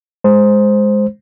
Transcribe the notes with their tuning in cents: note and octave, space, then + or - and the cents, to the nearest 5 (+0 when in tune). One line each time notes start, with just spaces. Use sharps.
G#3 +0 C5 +0